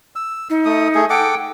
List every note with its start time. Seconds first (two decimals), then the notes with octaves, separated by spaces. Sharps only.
0.16 E6
0.50 D#4
0.65 A3 D#6
0.95 A3 G#4
1.10 A4 F#5 G5 D6